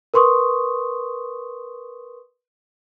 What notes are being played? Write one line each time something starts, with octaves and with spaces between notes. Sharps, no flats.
A#4 B4 C6 C#6 D#6